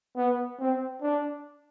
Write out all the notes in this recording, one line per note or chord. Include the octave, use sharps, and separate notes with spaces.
B3
C4
D4